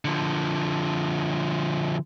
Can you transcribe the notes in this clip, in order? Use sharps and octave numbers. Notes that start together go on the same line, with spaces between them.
D3 F3